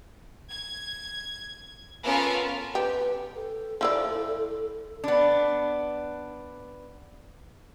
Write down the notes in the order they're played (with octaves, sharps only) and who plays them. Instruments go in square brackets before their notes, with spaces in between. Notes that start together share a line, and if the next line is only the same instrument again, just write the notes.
[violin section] G#6
B3 C#4 F4 A4 A#4
[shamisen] G4 [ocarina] B4
[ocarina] A4
[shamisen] F3 E4 D5
[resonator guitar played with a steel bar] B3 D4